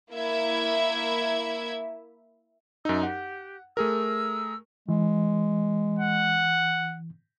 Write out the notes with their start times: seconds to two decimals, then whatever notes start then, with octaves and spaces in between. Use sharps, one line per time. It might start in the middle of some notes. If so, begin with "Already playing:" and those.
0.13 A#3 E4 E5 G#6
2.85 F#2 D#4 E6
3.03 G4 F#5
3.77 A3 G#4 A#4 E6
4.89 E3 G#3
5.99 F#5